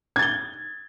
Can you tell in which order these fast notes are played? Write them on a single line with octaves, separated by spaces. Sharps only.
G#6 A6 G7